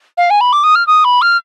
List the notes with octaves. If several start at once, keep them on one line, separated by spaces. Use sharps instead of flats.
F5
G#5
B5
D6
D#6
F6
D#6
B5
F6